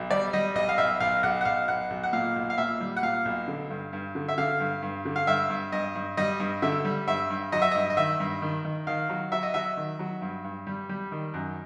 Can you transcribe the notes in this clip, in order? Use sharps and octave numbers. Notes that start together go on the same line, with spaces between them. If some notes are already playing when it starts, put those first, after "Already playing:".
Already playing: B1
G3 D5
G3 D#5
B1 D#5
F5
B1 E5
B1 F5
B1 F#5
F#5
B1 F5
B1 F#5
B1
F#5
A#2 F5
B1
F5
A#2 E5
G3
F#5
A#2 F5
B1
D3
G2
G2
D3
E5
D3 F5
G2
G2
D3
F5
G2 E5
G2
G2 D#5
G2
G3 D#5
G2
D3 E5
G3
G2 E5
G2
F#3 D#5
E5
G2 D#5
D#5
D#3 E5
G2
D#3
D#3
D#3 F5
F#3
F#3 E5
D#5
F#3 E5
D#3
F#3
G2
G2
G3
G3
D#3
F#2